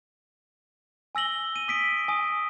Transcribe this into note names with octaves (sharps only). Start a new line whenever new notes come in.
G#5 E6 A#6 F#7 G7
D#7
D#6 B6 D7
G#5 D#6